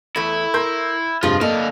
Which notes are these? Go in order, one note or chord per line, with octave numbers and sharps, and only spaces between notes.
E2 A3 E4
A#4 C6 G6
F1 G2 F3 G#3 F4
D3 A#3 A4 D#5 F5